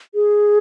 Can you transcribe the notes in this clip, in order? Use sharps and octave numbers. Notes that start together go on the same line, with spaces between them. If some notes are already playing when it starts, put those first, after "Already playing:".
G#4